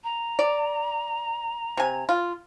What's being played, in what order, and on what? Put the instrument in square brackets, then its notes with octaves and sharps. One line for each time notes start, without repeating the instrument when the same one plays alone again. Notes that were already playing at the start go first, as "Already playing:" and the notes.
[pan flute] A#5
[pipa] D5
C3 G#5
F4